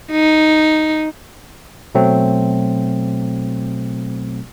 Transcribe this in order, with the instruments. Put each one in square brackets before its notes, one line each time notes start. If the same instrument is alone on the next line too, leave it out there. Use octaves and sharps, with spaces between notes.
[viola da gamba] D#4
[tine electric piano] B2 F#3 A3 C4